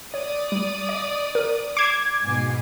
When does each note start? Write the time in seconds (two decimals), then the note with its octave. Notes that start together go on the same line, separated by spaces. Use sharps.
0.14 C#5 D5 D#6
0.52 G3
0.89 D#5
1.35 A#4
1.77 D6 G#6 C7 E7
2.25 G#2 B2 G#5